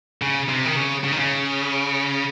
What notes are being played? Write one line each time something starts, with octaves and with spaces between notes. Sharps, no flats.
C#3
C3
D#3
C#3
C#3
D#3
C#3